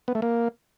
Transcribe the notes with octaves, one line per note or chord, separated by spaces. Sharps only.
B3
A3
A#3